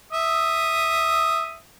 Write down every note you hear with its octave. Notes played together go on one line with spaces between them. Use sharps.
E5 D#6